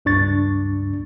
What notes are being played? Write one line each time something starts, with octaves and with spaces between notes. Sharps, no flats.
C#2 G2 D4 C#6 A6